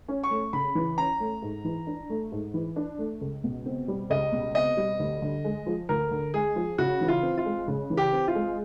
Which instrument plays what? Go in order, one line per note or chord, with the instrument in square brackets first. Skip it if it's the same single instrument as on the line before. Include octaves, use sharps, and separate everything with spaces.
[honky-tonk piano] C#4
[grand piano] C#6
[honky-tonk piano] A3
[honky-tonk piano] C#3 [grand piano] B5
[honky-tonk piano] E3
[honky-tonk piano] C#4 [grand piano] A#5
[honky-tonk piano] A3
G#2
E3
D4
A3
G#2
E3
D4
A3
C#2
B2
C4
G3
[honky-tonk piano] C#2 [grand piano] D#5
[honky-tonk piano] B2
[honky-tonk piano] C4 [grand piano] D#5
[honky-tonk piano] G3
D2
D3
G#3
F3
[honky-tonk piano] D2 [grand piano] A#4
[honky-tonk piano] D3
[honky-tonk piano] G#3 [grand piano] G#4
[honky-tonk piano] F3
[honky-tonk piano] C#3 [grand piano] F#4
[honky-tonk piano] E3
[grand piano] F4
[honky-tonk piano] C4
[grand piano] F4
[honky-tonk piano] G#3
C#3
E3
[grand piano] G4
[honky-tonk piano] C4
[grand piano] F4
[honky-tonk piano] G#3